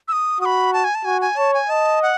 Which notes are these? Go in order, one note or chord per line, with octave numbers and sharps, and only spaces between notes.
E6
D#6
F#4 B5 D#6
A5
G#5
A5
F#4 G#5
G#5
C#5 A5
G#5
D#5 A5
F#5